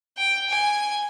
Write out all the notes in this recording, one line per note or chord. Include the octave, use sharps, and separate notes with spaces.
G5
G#5